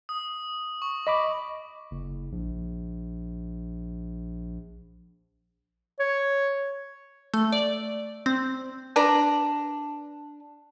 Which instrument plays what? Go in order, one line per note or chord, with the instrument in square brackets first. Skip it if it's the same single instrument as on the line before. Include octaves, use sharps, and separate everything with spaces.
[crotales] D#6
C#6
[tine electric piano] D#5 B5 D6
[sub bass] F#1
A#1
[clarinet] C#5
[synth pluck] A3
D5
C4
[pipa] D4 B4 A#5